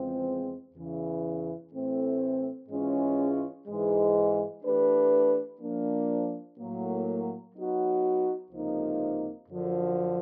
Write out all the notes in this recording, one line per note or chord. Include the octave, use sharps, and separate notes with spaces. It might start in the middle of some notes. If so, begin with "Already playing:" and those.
Already playing: E2 C#3 F3 G#3 C4
E2 C#3 E3
A2 E3 A3 C4
G#2 E3 G#3 C#4 F4
G#2 E3 G#3
E3 A3 D4 G4 B4
F3 A#3 D4
A2 F#3 A#3
F#3 B3 D#4 F#4
C#2 C3 F3 A#3 D#4
F#2 D3 F3